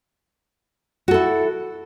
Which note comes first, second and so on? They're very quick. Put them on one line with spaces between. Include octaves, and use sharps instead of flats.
F#4 A4 E4